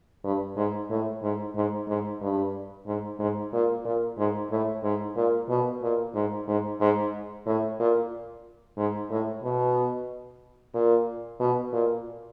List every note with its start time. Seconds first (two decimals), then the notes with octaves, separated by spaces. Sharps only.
0.24 G2
0.57 G#2
0.90 A2
1.22 G#2
1.56 G#2
1.88 G#2
2.21 G2
2.86 G#2
3.19 G#2
3.53 A#2
3.85 A#2
4.18 G#2
4.51 A2
4.83 G#2
5.17 A#2
5.49 B2
5.82 A#2
6.15 G#2
6.48 G#2
6.81 G#2
7.46 A2
7.79 A#2
8.77 G#2
9.11 A2
9.43 B2
10.74 A#2
11.40 B2
11.73 A#2